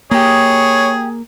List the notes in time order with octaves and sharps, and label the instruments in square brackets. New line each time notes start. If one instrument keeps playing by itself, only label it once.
[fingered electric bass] A#3 [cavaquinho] G4 D#5 [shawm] G#4 [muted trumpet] C#5